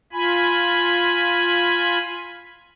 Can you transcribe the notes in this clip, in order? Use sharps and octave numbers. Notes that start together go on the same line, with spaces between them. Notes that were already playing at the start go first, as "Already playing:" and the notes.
F4 G#5 B5